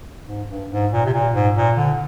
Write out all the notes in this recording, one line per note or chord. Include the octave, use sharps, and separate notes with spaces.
G#2
G2
G#2
A#2
C3
A#2
G#2
A#2
D3